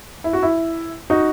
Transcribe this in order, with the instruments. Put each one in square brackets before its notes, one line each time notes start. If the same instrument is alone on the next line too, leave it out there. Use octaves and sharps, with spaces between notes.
[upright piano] E4
F#4
E4
D#4 F#4